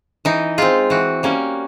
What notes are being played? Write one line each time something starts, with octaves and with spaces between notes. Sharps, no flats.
E3 D#4
G#3 C4 F4
E3 F#4
G3 A#3 C#4